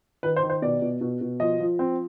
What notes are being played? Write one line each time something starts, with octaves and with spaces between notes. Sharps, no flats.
D#3 B4
C5
D#3
C5
B2 D5
B2
B2
B2
F3 D#5
F3
C4